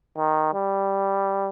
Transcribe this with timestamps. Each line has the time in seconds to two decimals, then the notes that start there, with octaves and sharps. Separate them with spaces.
0.18 D#3
0.54 G3